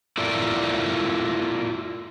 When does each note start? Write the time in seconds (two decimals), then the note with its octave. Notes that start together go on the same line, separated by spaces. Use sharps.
0.18 E4 F4 A4 A#4 D5